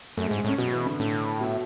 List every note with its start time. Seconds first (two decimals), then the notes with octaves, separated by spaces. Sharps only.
0.17 F#2 A3
0.27 G#3
0.31 G#2
0.38 G#3
0.45 A2 C#4
0.58 B2 F#3
0.72 E3
0.86 D3
1.00 A2 D3
1.41 B2